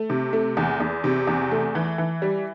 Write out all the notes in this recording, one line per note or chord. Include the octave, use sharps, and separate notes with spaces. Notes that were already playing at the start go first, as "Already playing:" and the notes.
Already playing: A3
C3
A3
E2
E2
C3
E2
A3
E3
E3
G3